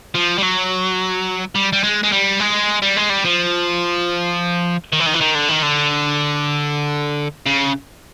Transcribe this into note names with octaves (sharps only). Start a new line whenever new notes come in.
F3
G3
F#3
G3
G3
G#3
G#3
G3
G#3
G3
G#3
G3
F3
D#3
E3
D#3
E3
D#3
D3
D#3
D3
C#3